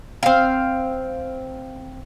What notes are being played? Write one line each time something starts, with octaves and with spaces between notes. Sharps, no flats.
C4 F5